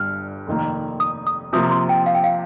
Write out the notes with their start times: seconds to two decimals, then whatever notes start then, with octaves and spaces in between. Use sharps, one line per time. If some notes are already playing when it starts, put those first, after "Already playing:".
Already playing: G1 G2 G3 F6
0.47 F1 F2 D#3 A#3
1.00 D#6
1.27 D#6
1.53 C3 F3 A#3 D#6
1.71 C6
1.89 G5
2.06 F5
2.15 G5
2.24 F5